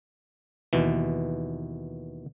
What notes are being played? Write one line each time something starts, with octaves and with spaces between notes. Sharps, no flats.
D#2 B2 E3